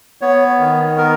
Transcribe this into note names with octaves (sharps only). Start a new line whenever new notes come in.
B3 C#5
D#3
B3 A#4